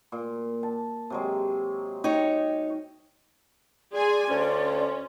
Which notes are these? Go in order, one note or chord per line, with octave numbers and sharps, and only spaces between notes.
A#2
A5
C3 F#3 G#3
D#4 C#5 G5
G#4 D5 G#5 C6
D2 C#4